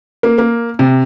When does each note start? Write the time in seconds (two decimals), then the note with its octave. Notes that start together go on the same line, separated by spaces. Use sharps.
0.23 A#3
0.38 A#3
0.79 C3